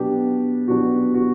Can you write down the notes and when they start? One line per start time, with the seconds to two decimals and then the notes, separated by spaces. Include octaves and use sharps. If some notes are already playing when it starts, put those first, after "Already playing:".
Already playing: B2 F#3 B3 D4 G4
0.68 B2 F#3 B3 D4 F#4
1.14 F#4